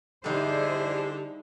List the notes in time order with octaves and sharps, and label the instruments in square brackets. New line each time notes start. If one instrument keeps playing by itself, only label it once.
[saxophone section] D3 [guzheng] G3 D#4 [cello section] E4 G#4 C5 [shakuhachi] G4